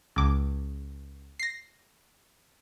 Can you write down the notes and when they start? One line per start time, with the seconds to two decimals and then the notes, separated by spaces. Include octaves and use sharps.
0.16 C#2 D6
1.39 A#6 C7